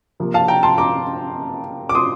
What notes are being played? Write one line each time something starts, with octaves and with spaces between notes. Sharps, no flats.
C3 F3 A#3
F5 A5
G5 A#5
A5 C6
A#5 D6
D6
C6 D#6